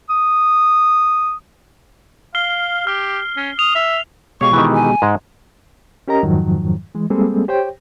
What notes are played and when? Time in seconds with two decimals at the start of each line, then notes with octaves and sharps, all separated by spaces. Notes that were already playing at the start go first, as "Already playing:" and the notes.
0.10 D#6
2.35 F5 F6 C7 G7
2.87 G4 F6
3.37 C#4
3.59 D#6 F7
3.75 E5
4.41 B2 G#3 G4 C#5 F5 C#6
4.53 D#3 E3
4.74 G#5
5.02 G#2 G#3
6.08 C#4 G4 A#4 D#5 A#5
6.23 F2 G#2 D#3 F3 F#3
6.95 E3 G#3
7.10 G3 G#3 A#3 C4 G#4 A4
7.48 G4 C5 C#5 G5